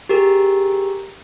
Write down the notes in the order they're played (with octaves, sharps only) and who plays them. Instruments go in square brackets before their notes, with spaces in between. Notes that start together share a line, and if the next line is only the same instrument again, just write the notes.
[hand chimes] G4 G#4 A#4